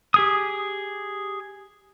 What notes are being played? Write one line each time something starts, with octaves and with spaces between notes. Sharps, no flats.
G4 G#4 D#6